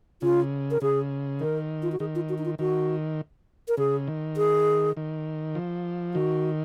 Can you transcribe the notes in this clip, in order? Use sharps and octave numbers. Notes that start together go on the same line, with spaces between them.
C#3 F4
A#4
C#3 G#4
D#3 A#4
F4
F#4
D#3 G#4
F4
F#4
D#4
F4
D#3 F#4
A#4
C#3 G#4
D#3
G#4
D#3
F3
D#3 F#4